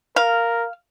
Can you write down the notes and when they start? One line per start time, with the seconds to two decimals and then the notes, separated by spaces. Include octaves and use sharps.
0.16 A#4 F5